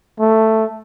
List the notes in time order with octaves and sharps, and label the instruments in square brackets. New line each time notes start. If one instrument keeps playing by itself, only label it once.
[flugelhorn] A3